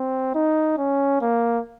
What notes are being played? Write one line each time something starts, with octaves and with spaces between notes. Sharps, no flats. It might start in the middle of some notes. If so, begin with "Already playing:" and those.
Already playing: C4
D#4
C#4
A#3